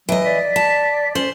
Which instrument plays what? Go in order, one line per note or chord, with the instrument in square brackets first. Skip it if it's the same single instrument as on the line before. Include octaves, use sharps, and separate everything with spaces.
[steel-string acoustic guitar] E3 D#5 [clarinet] F#3
[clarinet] D5 [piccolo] B6
[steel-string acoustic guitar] A5
[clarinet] C#4 [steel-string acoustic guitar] C5 [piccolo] F#7